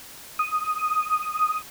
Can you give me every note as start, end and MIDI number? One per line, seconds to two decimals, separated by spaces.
0.39 1.62 87